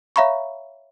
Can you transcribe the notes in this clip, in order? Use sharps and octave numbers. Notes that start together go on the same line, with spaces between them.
C#5 E5 F5 A#5 B5 C#6